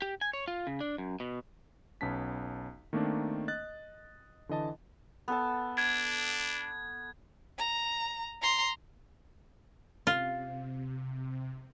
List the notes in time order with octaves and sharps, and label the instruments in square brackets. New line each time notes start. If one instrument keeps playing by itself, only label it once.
[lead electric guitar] G4
G#5
C#5
F4
C#3
D4
F#2
B2
[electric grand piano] B1 B3 C#4 A5 B6
D#3 A3 A#3 C4 D4
D#5 F#6 A6
D3 E3 D#5 A5
[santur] B3 A4 A5
[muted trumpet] D4 [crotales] G#6
[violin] A#5
A#5 C6
[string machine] C3 [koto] F4